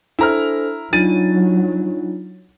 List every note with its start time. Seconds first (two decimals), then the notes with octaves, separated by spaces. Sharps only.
0.19 D4 E4 A4 C5 A#5 F6
0.93 F#3 D4 D#4 F4 A6 D#7